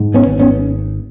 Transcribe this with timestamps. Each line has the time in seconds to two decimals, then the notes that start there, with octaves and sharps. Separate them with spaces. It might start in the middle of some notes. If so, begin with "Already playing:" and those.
Already playing: G#2
0.14 B3 C#4
0.27 G#1
0.40 B3 C#4